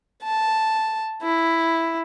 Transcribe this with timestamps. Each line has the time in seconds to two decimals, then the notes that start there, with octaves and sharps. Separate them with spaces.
0.24 A5
1.23 E4